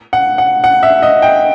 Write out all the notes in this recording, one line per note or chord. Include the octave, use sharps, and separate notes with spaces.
F#5
F#5
F#5
E5
D#5
G5